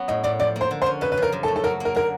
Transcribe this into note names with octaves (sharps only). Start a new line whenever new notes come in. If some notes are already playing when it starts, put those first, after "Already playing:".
Already playing: F#3 B3 C#4
A2 D#5
A2 D5
F3 D5
A#3
C5
D3
C5
C#4
C#3 B4
B4
F3 A#4
F#2
A4
A3
A4
F#3 A#4
A#3 A#4
D3 A#4